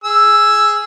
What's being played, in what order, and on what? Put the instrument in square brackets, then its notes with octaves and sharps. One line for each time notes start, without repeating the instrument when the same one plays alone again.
[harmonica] G#4 E6